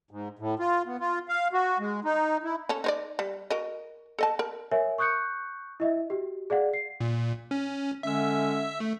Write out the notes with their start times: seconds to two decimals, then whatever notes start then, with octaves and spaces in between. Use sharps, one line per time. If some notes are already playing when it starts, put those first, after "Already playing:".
0.11 G#2
0.39 A2
0.59 F4
0.87 B3
1.00 F4
1.29 F5
1.53 F#4
1.79 G#3
2.04 D#4
2.44 E4
2.69 C#4 A4
2.84 D#4 C5 D5
3.19 G3
3.50 F#4 A#4 D#5
4.19 A4 D#5 A5
4.39 A#4
4.71 A#4 C#5 E5 G#5
4.98 C#6 D#6 F#6 G6 C#7
5.80 E4 D#5 E5
6.10 F#4 G4
6.50 G#4 D5 F5 F#5
6.74 C7
7.00 A#2
7.51 C#4
8.03 D3 G#3 C#4 E5 E6
8.80 A3